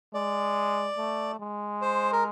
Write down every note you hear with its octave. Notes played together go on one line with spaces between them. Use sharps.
G#3 D5
A3
G#3
C5
A#4